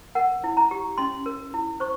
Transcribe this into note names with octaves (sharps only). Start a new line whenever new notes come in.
A#4 F#5
E4
A#5
G4
C#4 C6
A#4
E4
C5 C#6